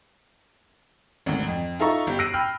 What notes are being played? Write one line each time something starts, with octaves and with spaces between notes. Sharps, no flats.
G#1 D2
F2
D#4 F4 A4 E5 A#5 C#6
G1 G4
E6 F#6 A#6 C7 D7 D#7
G5 B5 F6 F#6